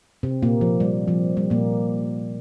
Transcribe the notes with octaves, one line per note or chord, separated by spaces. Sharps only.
C3 C4
A#2 A#3
F3
G3
F3
G3
A#2 A#3